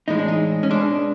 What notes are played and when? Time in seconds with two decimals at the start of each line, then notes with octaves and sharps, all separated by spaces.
0.08 A2 E3 G#3 D#4
0.19 D4
0.28 D#4
0.63 C#4
0.71 B2 G#3 D4